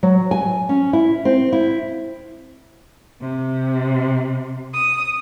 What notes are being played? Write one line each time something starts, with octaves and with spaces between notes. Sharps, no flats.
F#3
G#5
C#4
E4
C4
E4
C3
D#6